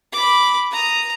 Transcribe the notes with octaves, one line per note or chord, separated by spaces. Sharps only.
B5 D6
A#5 D#6